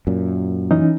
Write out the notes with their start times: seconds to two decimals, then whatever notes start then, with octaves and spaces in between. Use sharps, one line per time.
0.07 F#2 A#2
0.71 E3 C#4 D#4